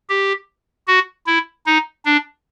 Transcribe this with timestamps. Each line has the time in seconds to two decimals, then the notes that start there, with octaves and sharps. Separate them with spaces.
0.09 G4
0.88 F#4
1.27 E4
1.66 D#4
2.05 D4